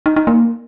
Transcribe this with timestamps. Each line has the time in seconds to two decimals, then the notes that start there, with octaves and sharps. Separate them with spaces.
0.06 D#4
0.16 D#4
0.27 A#3